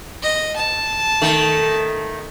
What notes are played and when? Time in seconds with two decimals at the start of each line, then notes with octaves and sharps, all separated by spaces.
0.22 D#5
0.56 A5
1.21 D#3 A3